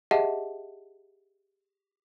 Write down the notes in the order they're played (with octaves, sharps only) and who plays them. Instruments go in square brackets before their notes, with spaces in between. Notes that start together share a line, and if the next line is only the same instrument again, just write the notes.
[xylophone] G4 G#4 D#5 E5 F#5 A5